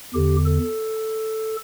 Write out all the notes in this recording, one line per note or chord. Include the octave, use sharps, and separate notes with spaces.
E2 D3 G4
A4